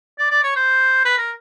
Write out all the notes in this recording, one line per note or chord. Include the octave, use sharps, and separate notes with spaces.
D5
D5
C#5
C5
B4
A#4